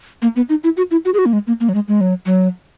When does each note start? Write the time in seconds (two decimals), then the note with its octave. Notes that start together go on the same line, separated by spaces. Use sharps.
0.22 A#3
0.36 B3
0.49 D#4
0.64 E4
0.77 F#4
0.91 E4
1.05 F#4
1.14 G#4
1.19 F#4
1.26 A#3
1.33 G#3
1.47 A#3
1.60 A#3
1.69 F#3
1.75 G#3
1.88 G#3
2.01 F#3
2.26 F#3